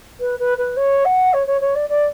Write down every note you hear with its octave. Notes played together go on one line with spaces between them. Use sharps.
B4
B4
B4
C#5
F#5
C#5
C#5
C#5
D5
D5